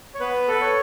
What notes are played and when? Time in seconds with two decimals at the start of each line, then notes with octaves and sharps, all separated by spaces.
0.15 C#5
0.20 B3 B4
0.48 A4 B4
0.61 C#5